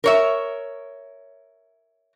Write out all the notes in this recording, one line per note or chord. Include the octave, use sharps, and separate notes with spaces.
A#4 C#5 E5